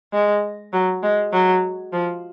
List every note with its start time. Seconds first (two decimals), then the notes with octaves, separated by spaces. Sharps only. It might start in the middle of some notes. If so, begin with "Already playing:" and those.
0.13 G#3
0.73 F#3
1.03 G#3
1.33 F#3
1.93 F3